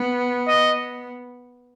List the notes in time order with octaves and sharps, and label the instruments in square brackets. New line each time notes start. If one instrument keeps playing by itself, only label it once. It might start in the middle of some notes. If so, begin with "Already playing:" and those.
Already playing: [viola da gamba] B3
[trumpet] D#5